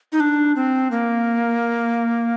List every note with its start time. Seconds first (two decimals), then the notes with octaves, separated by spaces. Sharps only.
0.12 D#4
0.20 D4
0.56 C4
0.91 A#3